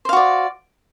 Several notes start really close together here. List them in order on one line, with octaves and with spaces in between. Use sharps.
C5 F5 F#4 D5